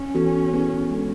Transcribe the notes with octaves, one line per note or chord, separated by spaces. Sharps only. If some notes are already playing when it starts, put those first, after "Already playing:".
Already playing: C#4
E3 B3 F#4 A4
E3 B3 E4 G#4
G#3 D4 A4